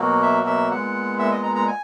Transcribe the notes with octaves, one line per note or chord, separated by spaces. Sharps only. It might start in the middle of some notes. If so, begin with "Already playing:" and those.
Already playing: B2 F#3 A#3
E5
E5
A#2 G#3 B3 F#5
E5
D#5
A#5
A#5
G#5